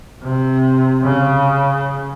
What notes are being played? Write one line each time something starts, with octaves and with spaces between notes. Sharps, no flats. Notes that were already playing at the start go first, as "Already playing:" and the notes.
C3
C#3